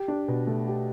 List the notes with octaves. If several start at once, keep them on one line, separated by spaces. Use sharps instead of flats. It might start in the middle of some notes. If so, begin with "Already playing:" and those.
Already playing: G4
D4
B2
A3
G4